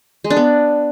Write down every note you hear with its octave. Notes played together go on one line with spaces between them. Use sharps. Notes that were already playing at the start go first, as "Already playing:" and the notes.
G#3
D4
B3